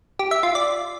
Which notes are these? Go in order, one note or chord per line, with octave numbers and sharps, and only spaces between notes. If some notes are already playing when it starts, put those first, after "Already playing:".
G4
E5
F4
D5